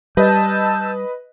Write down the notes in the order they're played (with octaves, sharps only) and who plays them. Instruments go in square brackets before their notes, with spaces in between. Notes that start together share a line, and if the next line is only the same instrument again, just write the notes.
[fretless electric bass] G3 [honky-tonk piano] B4 D#5 [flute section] A5 E6 G6